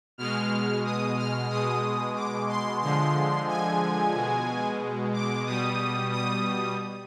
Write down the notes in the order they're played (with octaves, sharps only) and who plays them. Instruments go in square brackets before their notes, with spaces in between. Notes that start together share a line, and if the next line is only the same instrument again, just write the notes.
[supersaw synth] B2 G#3 F6
D#6
F6
B2 G#3 D#6
D6
C6
D3 F3 G#3 C6
G#5
B2 G#3
D6
B2 G3 D#6
D#6